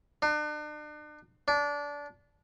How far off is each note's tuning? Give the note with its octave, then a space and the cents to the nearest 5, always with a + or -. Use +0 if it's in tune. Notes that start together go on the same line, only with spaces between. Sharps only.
D4 +40
D4 -20